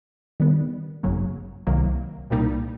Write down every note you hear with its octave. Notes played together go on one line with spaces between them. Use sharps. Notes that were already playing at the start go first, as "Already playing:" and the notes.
D#3 G3 B3
G#1 F#2 C#3 F#3 A#3
C2 C3 D#3 F#3 A#3
C2 A#2 G3 A#3 D#4